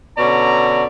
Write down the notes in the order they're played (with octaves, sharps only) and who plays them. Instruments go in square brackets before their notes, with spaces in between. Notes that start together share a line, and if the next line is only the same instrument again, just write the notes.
[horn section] B2 D3 C#4 D5 A#5